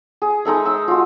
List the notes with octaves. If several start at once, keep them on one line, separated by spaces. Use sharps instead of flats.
G#4
G#3 D#4 A4 E5
D#4 E6
F4 F#4